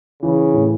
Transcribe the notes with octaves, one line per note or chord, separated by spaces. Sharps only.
C#3 E3
A2